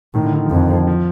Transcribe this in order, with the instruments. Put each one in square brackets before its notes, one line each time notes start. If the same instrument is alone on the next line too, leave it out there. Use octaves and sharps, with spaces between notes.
[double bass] A2 [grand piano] D#3
[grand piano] D3
D#3
F3
[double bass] F2 [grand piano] D#3
[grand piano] F3